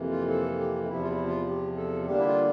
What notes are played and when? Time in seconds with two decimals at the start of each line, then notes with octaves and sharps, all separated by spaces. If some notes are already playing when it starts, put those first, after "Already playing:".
Already playing: F2 C3 E3 A#3
0.09 F4
0.29 A4
0.58 G4
0.88 E2 C3 F3 E4
1.03 F4
1.08 E4
1.27 F4
1.47 G4
1.77 A4
2.07 D3 G3 A#3 D4 G4
2.18 E4
2.26 F4